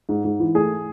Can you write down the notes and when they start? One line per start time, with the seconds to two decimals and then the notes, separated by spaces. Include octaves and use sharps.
0.09 G#2
0.25 G#2
0.40 E3
0.55 A3 G#4